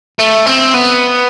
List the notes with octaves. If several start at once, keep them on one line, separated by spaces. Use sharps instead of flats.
A3
C4
B3